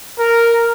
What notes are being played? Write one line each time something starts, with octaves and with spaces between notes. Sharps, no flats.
A#4